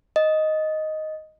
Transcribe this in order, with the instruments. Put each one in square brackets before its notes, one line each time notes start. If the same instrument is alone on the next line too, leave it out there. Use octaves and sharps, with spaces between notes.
[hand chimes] D#5